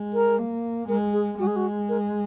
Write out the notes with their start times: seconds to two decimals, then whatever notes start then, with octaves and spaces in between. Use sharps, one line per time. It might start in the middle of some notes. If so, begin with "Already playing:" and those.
Already playing: G#3
0.13 A#4
0.38 A#3
0.89 G#3 A#4
1.13 G#4
1.38 G#3 F#4
1.47 G#4
1.56 F#4
1.89 A#4